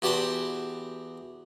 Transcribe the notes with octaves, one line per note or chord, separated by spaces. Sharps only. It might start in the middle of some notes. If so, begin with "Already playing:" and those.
E2 F#4 G4 A5 B5 C6